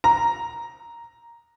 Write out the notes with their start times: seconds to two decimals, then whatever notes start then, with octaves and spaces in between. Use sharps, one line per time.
0.04 A#5